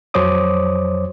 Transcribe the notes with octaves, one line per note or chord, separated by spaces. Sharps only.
F2 F#3 C5 C#5 D6 D#6